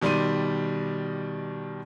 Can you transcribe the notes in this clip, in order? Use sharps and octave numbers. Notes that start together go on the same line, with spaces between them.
B2 D#3 G3 D5 C6 D#7